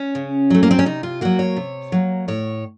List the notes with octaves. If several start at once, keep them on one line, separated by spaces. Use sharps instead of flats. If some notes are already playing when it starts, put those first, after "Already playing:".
Already playing: C#4
C#3
F#3 A3
A#3
C4
C#4
C3 D#4
F4
F#3 A#3 F#4
C#5
C3
F#3 A#3
A2 C#5